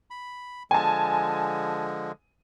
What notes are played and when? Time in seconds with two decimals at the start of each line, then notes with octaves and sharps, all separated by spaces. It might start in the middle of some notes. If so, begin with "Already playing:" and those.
0.10 B5
0.71 D3 F3 G#3 G#5 A5